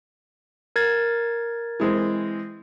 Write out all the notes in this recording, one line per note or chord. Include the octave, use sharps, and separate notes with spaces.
A#4 G#6 A6
E3 G#3 C4